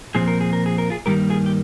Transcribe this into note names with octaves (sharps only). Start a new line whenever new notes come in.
A#2 F3 C4 G#4
A#4
G#4
A#4
G#4
A#4
F4 G#4
G2 D#3 G3 A#3 G4 A#4
F4 G#4
G4